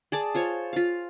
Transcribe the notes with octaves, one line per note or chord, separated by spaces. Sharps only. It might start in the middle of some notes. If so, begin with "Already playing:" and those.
G#4 D5 A5
F4 C5 C#5
F4 F5